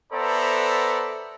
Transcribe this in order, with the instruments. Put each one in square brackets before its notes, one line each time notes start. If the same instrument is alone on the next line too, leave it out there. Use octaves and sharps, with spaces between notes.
[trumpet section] B3 A4 C5 D5 E5 A#5